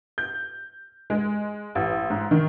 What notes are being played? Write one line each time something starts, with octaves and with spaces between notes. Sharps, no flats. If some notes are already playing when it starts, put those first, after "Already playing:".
G6
G#3
A1
G#2
D#3